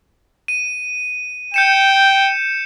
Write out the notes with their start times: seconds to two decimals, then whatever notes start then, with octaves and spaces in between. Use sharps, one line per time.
0.48 D#7
1.54 G5 G6 C#7 E7